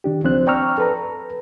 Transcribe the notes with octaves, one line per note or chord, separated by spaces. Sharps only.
D#3 D4 G4
C#2 F3 C4 D4 C5 F#6
D5 G5 A#5 C#6 E6 F6
A4 B4 A#5